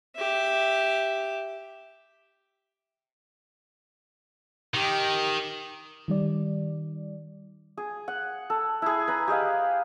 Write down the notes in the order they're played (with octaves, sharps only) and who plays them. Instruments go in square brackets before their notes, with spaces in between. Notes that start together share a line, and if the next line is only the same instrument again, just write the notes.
[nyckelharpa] G4 E5
[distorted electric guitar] D#3 [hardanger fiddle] G4
[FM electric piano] D#3 G3 D5
[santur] G#4
F#5
A4
E4 G#4
B4 A#5
G4 G#4 D#5 F5